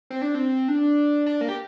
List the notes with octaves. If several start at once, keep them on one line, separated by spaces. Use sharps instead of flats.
C4
D4
C4
D4
D4
A#3
G4